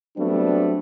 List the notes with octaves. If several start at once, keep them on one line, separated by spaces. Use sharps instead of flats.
F#3 G3 A3 B3 C4 D4